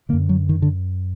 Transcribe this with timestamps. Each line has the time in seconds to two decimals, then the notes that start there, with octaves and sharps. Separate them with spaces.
0.09 D3 A#3
0.13 F#2
0.29 F#3
0.49 D#3
0.62 D3